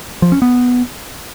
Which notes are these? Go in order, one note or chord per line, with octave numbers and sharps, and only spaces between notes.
F3
C#4
B3